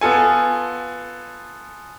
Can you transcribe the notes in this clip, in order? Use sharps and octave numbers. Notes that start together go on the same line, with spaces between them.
B3 F4 A4 G#5